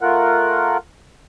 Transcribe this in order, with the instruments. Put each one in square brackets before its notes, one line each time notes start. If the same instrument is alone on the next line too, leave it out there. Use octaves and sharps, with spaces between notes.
[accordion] A3 F4 A#4 F#5